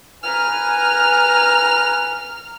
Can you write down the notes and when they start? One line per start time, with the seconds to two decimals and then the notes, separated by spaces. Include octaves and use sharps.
0.23 B4 G#5 A#5 F6